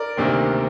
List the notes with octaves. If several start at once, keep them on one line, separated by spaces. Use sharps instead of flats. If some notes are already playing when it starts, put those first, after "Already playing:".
Already playing: A#4 D5
D2 C3 D#3 A#3